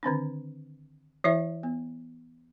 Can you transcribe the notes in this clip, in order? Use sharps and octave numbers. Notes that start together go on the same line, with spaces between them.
D3 D#3 C4 D4
E3 E4 C5 E5
B3